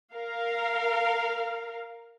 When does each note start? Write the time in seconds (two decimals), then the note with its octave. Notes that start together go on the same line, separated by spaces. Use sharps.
0.13 A#4 F5